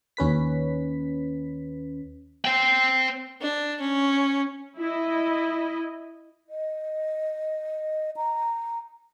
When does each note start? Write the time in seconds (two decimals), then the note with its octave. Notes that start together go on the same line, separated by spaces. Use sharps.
0.17 D#2 C#4 B4 B6
2.45 C5 G5
3.41 D4
3.80 C#4
4.78 E4 D#5
6.50 D#5
8.17 A#5